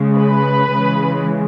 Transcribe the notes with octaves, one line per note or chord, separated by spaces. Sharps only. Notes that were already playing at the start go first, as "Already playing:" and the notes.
Already playing: C#3 G#3
B4
C#3 E3 G#3